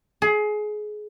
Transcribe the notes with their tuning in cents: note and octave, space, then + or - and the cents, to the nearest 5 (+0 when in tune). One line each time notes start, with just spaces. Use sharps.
G#4 +25